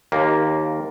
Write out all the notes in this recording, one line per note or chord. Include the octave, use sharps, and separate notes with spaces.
D#2 A#3